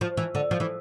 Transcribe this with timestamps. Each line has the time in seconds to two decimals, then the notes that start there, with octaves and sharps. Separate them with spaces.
0.01 F3
0.17 E3
0.35 D3
0.51 F3
0.60 E3